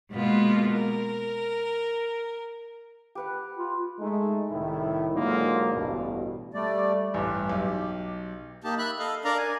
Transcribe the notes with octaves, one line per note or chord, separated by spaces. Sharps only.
B2 G#3 A#3 B3 F4
A#4
G4 B4 F#5
F4
G#3 A3 D#4
C2 A2 D#3 E4
G#2 D3 F#3 A#3 D#4 F4
A1 D2 G2 B2
G3 A3 D5
A1 G2 G4
B1
A#3 D#4 G4 A5
E5 B5 F#6
A4 D#5 F5
D4 A#4 D5 F5 A#5
G#5